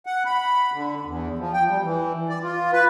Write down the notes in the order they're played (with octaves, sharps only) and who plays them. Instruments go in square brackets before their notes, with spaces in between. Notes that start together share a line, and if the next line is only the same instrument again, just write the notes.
[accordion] F#5
B5
D3
E2
F3
G5
G3
E3
D5
F4
B4